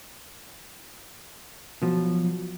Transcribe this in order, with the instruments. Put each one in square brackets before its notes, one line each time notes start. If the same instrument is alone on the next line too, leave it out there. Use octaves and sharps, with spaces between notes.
[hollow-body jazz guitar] B2 F3 F#3